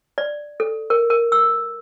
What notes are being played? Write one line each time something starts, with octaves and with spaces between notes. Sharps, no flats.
D5
A4
A#4
A#4
E6